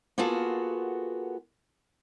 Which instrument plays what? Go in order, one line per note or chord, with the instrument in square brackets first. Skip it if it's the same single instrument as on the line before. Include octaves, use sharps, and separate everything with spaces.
[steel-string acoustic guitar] A#3 B3 F4 F#4 G#4 A4